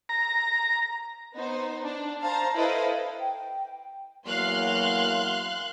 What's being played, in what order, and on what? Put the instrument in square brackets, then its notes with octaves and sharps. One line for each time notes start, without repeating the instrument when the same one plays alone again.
[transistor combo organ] A#5
[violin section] B3 D#4 C5
D4
C5 F5 A5 A#5
E4 A4 B4 C5 D#5 F5
[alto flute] G5
[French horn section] E2 F#3 A#3 [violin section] F5 C6 F#6